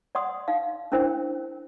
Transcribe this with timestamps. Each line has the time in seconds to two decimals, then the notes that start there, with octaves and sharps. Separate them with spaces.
0.15 D5 F#5 C6 D#6
0.48 D#4 F5
0.92 C#4 D4 E4 A#4 C5 G5